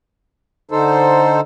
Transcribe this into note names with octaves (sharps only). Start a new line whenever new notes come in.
D3 D#4 A4 C5